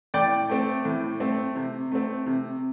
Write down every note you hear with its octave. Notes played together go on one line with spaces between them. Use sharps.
A2 D5 G5
A3 C4
A2
A3 C4
C3
A3 C4
C3